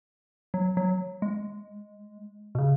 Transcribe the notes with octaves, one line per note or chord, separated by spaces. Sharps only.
F#3
F#3
G#3
B2
C#3